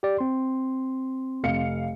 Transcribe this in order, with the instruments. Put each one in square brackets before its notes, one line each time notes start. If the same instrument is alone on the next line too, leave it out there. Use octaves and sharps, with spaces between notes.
[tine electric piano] G4 D5
C4 C6
[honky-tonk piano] F1 F5 C#7